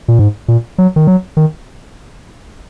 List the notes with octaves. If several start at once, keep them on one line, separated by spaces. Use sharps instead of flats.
A#2
G#2
A#2
F#3
D#3
F#3
D#3